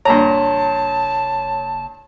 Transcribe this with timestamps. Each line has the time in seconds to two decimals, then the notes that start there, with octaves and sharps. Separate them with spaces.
0.05 F#1 G2 A#2 C#5 A5 A#5 C6